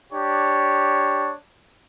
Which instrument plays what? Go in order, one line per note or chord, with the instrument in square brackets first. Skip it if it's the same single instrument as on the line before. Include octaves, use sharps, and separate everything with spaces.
[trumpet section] D4 G4 C#5